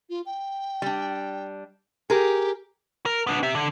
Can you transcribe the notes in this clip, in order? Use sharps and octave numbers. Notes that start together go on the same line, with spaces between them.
F4
G5
G3 D4
G4 G#4 A#4
A#4
B3 D4
G4 E5
D3